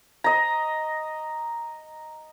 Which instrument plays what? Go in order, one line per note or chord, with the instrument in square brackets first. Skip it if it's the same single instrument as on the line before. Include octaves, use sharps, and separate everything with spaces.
[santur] D#5 A#5